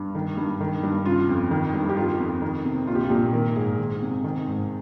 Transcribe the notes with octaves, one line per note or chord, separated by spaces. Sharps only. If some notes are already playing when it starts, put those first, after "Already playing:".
Already playing: G2
D#3
G2
D#3
G2
C#3 F4
F2
D#3
G2
G4
D#3 F4
F2
D#3
C3
A#1 F4
G4
F4
A#2 G4
D#3 A#4
G#2 G#4
D#3
C3
D#3
G#2